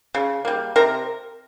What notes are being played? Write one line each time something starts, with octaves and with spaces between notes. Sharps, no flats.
C#3
G3 A#3
C3 A#4